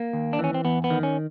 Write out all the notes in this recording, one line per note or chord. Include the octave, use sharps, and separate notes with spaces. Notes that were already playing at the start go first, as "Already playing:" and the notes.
Already playing: A#3
D#2
D4
E3 C#4
C4
E2 B3
B3
D#3
C#4